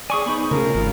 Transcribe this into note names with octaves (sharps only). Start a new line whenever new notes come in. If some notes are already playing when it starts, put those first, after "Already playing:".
G#4 D5 G#5 C#6 D#6
B3 D#4 C5 B5 C#6
C#3 A3 F4 G#4 A#4
G#1 C#4 F4